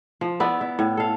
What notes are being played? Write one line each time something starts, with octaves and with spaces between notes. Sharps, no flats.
F3
B3 E4 D5
E4
A2
A4 F5